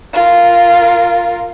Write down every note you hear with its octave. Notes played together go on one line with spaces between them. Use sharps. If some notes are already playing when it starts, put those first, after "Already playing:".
F4 A#4